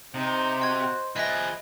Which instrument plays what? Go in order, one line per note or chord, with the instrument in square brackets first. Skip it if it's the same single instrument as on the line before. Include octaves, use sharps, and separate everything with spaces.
[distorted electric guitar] C3 [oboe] D#4 [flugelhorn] C5
[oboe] F#4 [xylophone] D#5 G#6
[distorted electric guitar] F3 G#4 [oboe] B4 [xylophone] D#5 E5 A#6